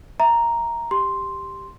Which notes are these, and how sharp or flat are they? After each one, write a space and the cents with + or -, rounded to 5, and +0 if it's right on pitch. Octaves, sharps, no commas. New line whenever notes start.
E5 +0 A#5 +0
G4 +0 C6 +0